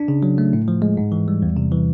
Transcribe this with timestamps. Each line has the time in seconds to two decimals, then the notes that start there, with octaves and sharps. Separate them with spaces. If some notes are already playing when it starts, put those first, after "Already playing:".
Already playing: D4
0.08 C#3
0.23 F#3
0.38 A3
0.53 A2
0.68 F3
0.82 G#3
0.97 G#2
1.12 E3
1.28 G3
1.42 E2
1.57 C3
1.72 E3